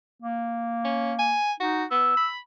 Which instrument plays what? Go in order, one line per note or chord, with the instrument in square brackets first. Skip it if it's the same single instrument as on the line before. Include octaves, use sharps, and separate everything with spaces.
[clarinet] A#3
[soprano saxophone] C#4
G#5
[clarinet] D#4 [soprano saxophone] F#4
[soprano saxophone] B3 [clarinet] E6
[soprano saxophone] B5